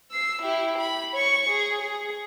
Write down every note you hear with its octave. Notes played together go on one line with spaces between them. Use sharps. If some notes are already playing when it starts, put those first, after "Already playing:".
E6 C7
E4 G4
B5
C#5 C#6
G#4
G#4